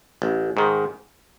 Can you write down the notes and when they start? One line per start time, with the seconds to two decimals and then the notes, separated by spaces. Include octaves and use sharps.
0.22 A1
0.57 G#2 D#3